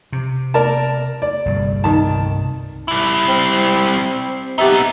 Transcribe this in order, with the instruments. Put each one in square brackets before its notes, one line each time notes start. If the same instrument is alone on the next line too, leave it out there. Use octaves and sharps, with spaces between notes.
[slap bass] C3
[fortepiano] A#4 D5 A5
D5
[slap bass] G1 C2
[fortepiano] D#3 A5
[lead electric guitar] G3 E4
[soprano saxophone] C4
[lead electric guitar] B3 D#4 [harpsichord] G4 A4 E5